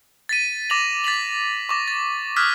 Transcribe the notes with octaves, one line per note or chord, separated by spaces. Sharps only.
A6 B6 D#7
D6 A6 A#6 F7 F#7
A6 B6 F7 F#7
C#6 D6 A#6
A6
D6 D#6 F6 F#6 G#6 B6